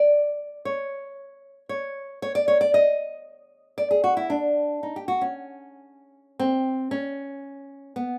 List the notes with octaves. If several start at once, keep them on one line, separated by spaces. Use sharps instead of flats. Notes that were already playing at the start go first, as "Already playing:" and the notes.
Already playing: D5
C#5
C#5
C#5
D5
C#5
D5
D#5
D5
G#4
F#4
E4
D4
D#4
G4
F#4
C#4
C4
C#4
B3